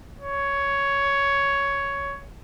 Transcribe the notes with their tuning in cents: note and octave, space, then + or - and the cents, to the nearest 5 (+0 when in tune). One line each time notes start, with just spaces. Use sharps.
C#5 +10